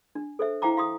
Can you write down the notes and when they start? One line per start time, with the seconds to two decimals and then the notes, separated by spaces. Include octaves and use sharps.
0.15 D4
0.39 A4 C5 E5
0.62 E4 C5 F5 G5 A#5 D6
0.77 F5 C6 D#6